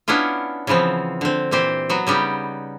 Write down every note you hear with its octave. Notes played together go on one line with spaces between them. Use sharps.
B3 C#4 D4 E4 F4
C#3 E3 F3 B3 C4
D3 C4
A#2 E3 C4 G4 C5
F#3 B3 F#4
C#3 G3 B3 D#4 G4